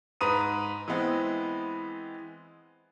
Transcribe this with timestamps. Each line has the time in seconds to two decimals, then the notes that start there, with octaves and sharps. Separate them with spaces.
0.21 G#2 B4 A#5 D#6 D#7
0.88 E3 G#3 B3 C4